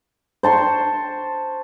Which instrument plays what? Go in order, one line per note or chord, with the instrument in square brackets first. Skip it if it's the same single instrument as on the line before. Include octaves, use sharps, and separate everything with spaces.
[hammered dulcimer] C5 A5 C6 C#6